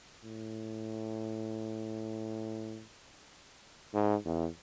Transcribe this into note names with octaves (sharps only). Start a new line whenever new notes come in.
A2
G#2
E2